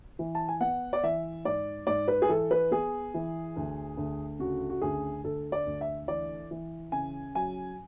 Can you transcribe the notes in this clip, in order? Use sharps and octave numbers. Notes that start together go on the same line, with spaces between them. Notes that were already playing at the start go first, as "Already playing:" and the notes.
E3
A5
G#5
B3 F#5
D5
E3 E5
G#2 D5
G#2 D5
B4
G#4
E3 A4
B4
B3 G#4
E3
D2
D2
C#3 F#4
F#4
D2 G#4
D2 A4
D5
D2
E5
E3 D5
E3
C#3 G#5
F#3 G#5